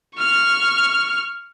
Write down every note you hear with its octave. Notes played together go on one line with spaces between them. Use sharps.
C#6 F6